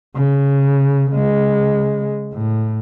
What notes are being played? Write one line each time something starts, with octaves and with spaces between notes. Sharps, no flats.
C#3
C#3 G#3
A2